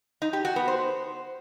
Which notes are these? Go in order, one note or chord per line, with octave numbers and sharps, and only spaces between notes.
D#4
G4
F#4
B3
C5